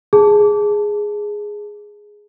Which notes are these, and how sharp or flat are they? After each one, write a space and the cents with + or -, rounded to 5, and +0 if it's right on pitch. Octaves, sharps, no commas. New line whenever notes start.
G#4 +0 A5 +0